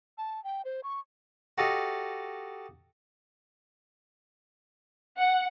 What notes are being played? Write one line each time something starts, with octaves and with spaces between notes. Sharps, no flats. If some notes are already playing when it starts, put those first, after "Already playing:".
A5
G5
C5
C#6
F#4 G4 A4 D#5 F5
F#5